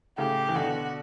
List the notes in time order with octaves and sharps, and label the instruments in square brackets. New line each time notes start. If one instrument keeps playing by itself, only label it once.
[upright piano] A2 C#3 [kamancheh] G4
[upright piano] E3
[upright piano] B2 D3 [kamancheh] F#4